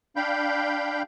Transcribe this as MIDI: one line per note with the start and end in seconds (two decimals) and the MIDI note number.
0.16 1.03 62
0.16 1.03 77
0.16 1.03 79
0.16 1.03 83
0.16 1.03 91